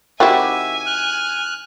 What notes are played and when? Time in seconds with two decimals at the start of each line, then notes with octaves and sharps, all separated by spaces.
0.20 D#3 C4 E4 F#4 G4 E5 G#5
0.86 F6 F#6